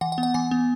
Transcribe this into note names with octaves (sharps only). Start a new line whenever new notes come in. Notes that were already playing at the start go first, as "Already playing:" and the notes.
E3 F#5
F#5
B3
F#5
E3 G#5
B3